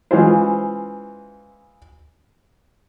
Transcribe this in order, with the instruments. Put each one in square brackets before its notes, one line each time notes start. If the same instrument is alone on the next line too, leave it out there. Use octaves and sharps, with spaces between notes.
[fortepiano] E3 G#3 C#4 F4 C5